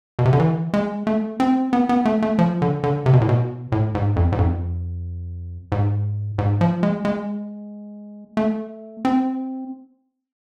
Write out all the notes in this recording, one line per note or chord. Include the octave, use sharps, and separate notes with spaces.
B2
C3
D3
E3
G#3
A3
C4
B3
B3
A3
A3
F3
D3
D3
C3
B2
A2
B2
A2
G#2
F2
G#2
F2
G#2
G#2
F3
G#3
G#3
A3
C4